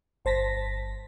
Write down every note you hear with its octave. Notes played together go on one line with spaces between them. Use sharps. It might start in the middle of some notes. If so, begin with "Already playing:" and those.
G1 C5 A5 A#6 B6